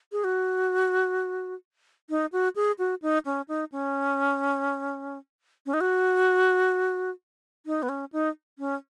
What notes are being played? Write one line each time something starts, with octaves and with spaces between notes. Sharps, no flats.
G#4
F#4
D#4
F#4
G#4
F#4
D#4
C#4
D#4
C#4
C#4
D#4
F#4
D#4
B3
C#4
D#4
C#4